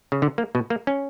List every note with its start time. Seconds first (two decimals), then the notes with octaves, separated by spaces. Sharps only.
0.12 C#3
0.22 D3
0.38 A#3
0.55 B2
0.70 A#3
0.87 C#4